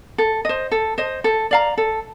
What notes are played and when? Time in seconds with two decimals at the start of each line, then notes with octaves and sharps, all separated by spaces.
0.18 A4
0.45 C5 D#5
0.72 A4
0.98 C5 D#5
1.24 A4
1.51 D5 F5 A#5
1.78 A4